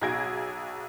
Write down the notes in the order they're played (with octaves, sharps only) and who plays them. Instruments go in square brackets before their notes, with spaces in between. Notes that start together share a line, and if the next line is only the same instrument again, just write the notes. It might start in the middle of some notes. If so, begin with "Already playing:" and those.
[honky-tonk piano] B1 F#4 G#4 G#6 A#6 D7